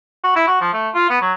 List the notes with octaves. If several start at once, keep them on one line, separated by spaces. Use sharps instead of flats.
F#4
E4
F#4
F3
A3
F4
B3
F#3